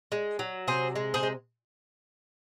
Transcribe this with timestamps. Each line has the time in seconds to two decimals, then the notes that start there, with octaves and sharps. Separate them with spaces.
0.12 G#3
0.39 F#3
0.67 C3 G#4 C5
0.96 G#3
1.14 G#4 C5
1.23 G#3